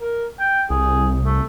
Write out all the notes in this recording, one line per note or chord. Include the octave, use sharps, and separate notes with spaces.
A#4
G5
C2 G#4
A3